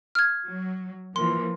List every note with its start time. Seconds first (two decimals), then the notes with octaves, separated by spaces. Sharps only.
0.15 F6 G#6
0.47 F#3
1.16 E3 F3 A#3 C6